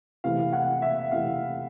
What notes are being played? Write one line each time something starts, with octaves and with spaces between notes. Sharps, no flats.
C3 E3 A3 F5
F#5
E5
C3 E3 A3 F5